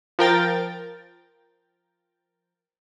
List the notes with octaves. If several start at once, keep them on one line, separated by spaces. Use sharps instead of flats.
F3 A#4 G5 A6